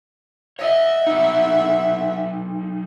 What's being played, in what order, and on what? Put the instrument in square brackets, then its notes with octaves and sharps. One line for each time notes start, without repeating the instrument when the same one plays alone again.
[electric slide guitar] C#5 D#5 [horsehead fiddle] E5 F#5
[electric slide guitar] F#3 D#4